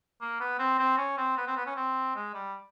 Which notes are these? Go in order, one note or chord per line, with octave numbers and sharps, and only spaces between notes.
A#3
B3
C4
C4
C#4
C4
B3
C4
B3
C#4
C4
G#3
G3